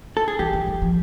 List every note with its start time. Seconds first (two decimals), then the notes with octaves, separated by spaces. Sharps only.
0.17 A4
0.28 G#4
0.39 E3 G4
0.53 E3
0.67 F3
0.82 F3